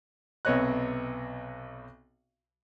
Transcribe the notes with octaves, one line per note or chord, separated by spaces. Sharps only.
B1 C3 B3 C#5 D#5 F#6